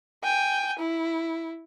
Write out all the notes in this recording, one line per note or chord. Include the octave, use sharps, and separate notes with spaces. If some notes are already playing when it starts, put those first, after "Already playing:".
G5 G#5
E4